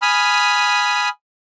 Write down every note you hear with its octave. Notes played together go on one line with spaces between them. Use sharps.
G#5 B5 D#6 F6